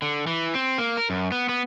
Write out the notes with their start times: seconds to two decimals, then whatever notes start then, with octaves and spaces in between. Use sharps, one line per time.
0.02 D3
0.27 E3
0.55 C4
0.78 A#3
0.97 A#4
1.10 F#2
1.32 B3
1.49 B3